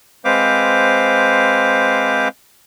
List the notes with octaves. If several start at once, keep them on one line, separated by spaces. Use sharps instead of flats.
G#3 C4 B4 C5 F5 D6